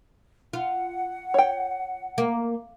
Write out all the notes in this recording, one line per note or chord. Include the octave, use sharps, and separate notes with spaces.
F4 F#5
C#5 G5
A#3